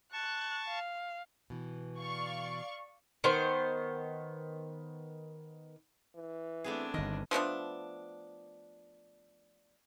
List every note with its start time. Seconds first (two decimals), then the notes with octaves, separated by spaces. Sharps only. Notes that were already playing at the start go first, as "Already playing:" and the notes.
0.12 A5 C#6 F#6
0.68 F5
1.50 B2 E3
1.98 D5 F5 C#6
3.24 D#3 B3 C5
6.15 E3
6.64 A3 B3 C4 D4 G#4
6.94 G1 D#3 D#5
7.31 F3 A3 B3 D4